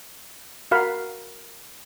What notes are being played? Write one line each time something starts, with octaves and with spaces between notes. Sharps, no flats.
F#4 A#4 F5 F#5 B5